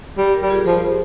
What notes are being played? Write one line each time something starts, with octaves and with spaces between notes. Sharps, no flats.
G3
G4 A#4
G3
F4 G#4
F3 G#4 C5